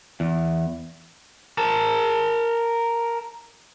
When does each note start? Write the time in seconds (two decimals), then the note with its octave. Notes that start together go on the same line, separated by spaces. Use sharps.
0.20 E2
1.58 A#4 A5